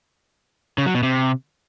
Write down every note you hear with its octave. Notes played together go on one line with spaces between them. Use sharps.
C#3
F#3
B2
C3